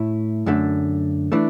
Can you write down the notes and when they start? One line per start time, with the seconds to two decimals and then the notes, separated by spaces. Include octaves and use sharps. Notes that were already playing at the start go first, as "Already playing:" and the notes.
Already playing: A2 A3 E4
0.46 F#2 D3 A3
1.32 E3 A3 D4